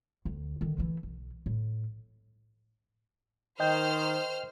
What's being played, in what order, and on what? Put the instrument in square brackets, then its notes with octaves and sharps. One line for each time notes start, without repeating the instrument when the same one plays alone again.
[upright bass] D2
D3 D#3
E3 A3
B1
A2
[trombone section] D#3 [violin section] C5 F6 [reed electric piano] D#5 G5 G6